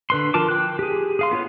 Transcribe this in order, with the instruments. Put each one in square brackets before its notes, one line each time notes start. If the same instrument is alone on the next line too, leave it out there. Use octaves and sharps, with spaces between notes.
[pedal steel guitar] D3 B4 C6
F3 F4 A#4 A5 D6
G5 F#6
G4 G#4
G#4 F5 C6
B3 F4 C#5